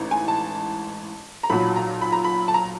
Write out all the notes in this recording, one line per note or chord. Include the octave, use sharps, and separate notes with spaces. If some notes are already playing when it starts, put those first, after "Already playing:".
Already playing: A1 G#2 E3
G#5
A5
A#5
B1 A#2 F#3 B5
A#5
B5
A#5
B5
A5
A#5